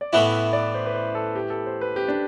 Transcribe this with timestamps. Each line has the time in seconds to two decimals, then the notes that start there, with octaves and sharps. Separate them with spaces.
0.01 D5
0.13 A2 E3 B3 E4 E5
0.32 E5
0.53 D5
0.74 C5
0.86 B4
0.94 C5
1.15 A4
1.35 G4
1.50 A4
1.66 C5
1.81 B4
1.96 G4
2.08 D4